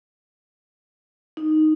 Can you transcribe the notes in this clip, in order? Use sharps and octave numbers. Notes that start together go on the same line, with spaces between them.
D#4